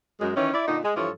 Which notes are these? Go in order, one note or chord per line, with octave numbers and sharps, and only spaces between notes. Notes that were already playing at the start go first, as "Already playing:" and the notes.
F#2 G#3
D#3 E3 C#4
E4 D5
A#2 D3 D#4
G#3
G2 E3 F3 A4 C#5